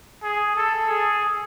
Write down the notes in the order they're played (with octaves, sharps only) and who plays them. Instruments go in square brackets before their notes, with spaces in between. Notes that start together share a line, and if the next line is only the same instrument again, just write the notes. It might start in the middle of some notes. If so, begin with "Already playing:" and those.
[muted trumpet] G#4
A4
G#4